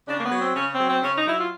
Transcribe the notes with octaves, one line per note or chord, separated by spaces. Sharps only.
C#3 D4
A#3
B3
F#3
C4
C#3 C#4
C4
F#3
C4
C#3 C#4
D#4
F#3 E4
F4